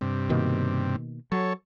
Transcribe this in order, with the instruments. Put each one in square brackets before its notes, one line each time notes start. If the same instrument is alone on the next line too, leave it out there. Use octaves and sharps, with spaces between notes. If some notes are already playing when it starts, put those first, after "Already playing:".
[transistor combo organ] G2 C3
[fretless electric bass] B2 D#3 A#3
[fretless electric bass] F#3 [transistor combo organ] A4 C#5